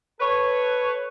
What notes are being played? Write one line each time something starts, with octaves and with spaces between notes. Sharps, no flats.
A4 B4 C#5